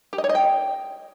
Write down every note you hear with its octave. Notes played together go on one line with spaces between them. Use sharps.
G4
D#5
C#5
D#5
G5